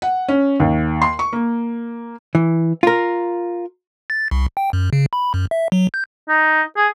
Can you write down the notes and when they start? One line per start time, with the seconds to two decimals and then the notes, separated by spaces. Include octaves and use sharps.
0.02 F#5
0.28 C#4
0.60 D#2
1.02 C6
1.19 C#6
1.33 A#3
2.35 E3
2.83 F4 A#4
4.10 A6
4.31 C2
4.57 G5
4.73 F#2
4.93 C#3
5.13 B5
5.34 F#2
5.51 E5
5.72 F#3
5.94 G6
6.28 D#4
6.76 G#4